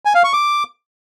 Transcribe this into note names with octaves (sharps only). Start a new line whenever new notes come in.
G#5
F5
C#6
D6